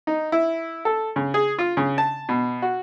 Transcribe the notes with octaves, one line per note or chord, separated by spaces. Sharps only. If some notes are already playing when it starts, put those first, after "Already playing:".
D#4
E4
A4
C#3
G#4
F4
C#3
A5
B2
F#4